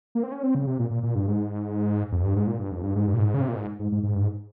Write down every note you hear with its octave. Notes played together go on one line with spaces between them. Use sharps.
A#3
C4
C#4
C4
C#3
C3
A#2
A#2
A#2
G2
G#2
F2
G2
G#2
A#2
G2
F2
G2
G#2
G2
A#2
G#2
C#3
C3
A#2
G#2
G#2
G#2
G#2
G2
G#2